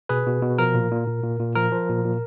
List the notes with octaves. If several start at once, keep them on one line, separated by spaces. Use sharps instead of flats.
B2 G#4 B4
B2
B2
F3 A#4
A#2
A#2
A#2
A#2
A#2
F3 A#4
F3
A#2
A#2